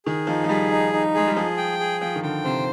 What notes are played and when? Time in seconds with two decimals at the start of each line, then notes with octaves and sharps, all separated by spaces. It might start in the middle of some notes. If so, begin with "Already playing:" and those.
0.06 D#3 G#4
0.27 F3 D#4
0.44 F3
0.49 G3 G#4
0.71 D#4
0.93 D#4
1.15 G#3 G#4
1.27 G3
1.36 F3 G#4
1.57 G5
1.79 G#4
2.01 F3 G5
2.16 D#3
2.23 D3 G5
2.44 C3 C5